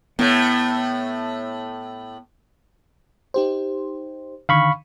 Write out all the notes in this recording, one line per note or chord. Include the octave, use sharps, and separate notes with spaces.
A2 A3 B3
D#4 G4 C5
D3 D#3 F5 B5 C#6